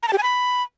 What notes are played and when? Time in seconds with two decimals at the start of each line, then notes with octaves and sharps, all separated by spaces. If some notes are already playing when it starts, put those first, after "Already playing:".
0.03 A#5
0.08 A5
0.13 G4
0.18 G#5
0.23 B5